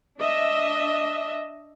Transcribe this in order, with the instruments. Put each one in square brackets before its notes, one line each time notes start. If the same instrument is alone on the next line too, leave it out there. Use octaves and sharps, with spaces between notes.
[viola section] D4 D#5 E5